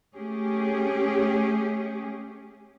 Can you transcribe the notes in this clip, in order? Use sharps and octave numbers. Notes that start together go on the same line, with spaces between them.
A3 C#4 G4 G#4